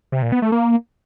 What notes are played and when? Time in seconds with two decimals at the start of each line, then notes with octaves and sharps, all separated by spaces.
0.12 C3
0.22 A#2
0.32 B3
0.42 A3
0.52 A#3